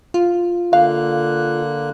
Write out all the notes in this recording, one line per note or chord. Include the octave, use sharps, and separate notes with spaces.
F4
D3 A#3 F5 F#6